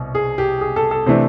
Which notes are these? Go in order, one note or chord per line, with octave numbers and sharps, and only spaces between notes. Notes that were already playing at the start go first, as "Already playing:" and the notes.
Already playing: C2 B2
G#4
G4
G#4
A4
A4
C3 E3 A3 D4 C5